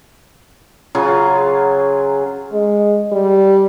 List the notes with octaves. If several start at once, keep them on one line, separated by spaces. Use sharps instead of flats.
C#3 F#3 F4 G#4
G#3
G3